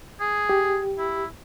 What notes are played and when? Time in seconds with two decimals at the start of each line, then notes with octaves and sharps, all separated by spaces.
0.20 G#4
0.49 G4
0.98 E4